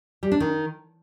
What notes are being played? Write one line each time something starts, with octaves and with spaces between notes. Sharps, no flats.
G3
D4
D#3